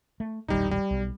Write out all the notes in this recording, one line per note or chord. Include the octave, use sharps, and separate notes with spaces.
A3
E1 A#1 D#3 G3 D#4
G3
B1